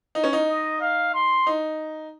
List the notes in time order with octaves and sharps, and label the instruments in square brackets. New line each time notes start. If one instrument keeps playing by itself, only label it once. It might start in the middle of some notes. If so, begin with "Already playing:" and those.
[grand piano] D#4
C#4
D#4
[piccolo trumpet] D#5
F5
C6
[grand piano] D#4